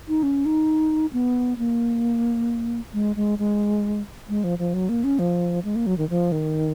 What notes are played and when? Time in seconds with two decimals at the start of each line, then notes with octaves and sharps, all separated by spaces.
0.08 D#4
0.23 C#4
0.46 D#4
1.13 B3
1.58 A#3
2.93 G#3
3.16 G#3
3.39 G#3
4.29 G#3
4.44 F3
4.59 F3
4.74 F#3
4.89 A#3
5.04 C#4
5.19 F3
5.65 G#3
5.76 A#3
5.86 F#3
5.98 D#3
6.09 F3
6.32 D#3